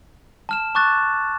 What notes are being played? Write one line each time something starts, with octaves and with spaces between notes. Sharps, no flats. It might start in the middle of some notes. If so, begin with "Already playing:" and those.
A5 F6 E7
A5 C#6 D6 F#6 A6